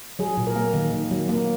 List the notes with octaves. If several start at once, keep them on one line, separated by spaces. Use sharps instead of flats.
F#3 G#4
A#2
A#4
A#3
D#3
D#3
F#3
A#3